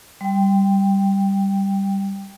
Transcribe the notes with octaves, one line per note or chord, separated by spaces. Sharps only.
G3 G5